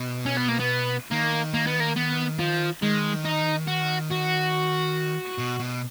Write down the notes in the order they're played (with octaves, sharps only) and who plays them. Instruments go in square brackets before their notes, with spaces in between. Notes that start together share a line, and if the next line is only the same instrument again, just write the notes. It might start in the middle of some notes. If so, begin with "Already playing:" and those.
Already playing: [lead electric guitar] B2
[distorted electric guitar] C#4
B3
A#3
B3
[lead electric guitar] D#3 [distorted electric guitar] A#3
[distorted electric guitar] A#3
B3
A#3
B3
F3
[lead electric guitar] D#3 [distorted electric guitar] G#3
[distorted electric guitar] D#4
F#4
F#4
[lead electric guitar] B2
B2